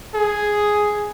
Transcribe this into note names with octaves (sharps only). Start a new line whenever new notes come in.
G#4